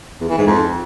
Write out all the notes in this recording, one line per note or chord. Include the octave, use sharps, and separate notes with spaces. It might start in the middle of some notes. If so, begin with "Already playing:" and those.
E2
E3
G#2
F2